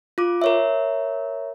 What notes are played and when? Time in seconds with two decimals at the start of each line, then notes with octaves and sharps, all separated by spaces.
0.18 F4 D6
0.42 A#4 C#5 E5